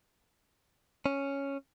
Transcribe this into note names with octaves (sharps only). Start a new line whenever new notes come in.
C#4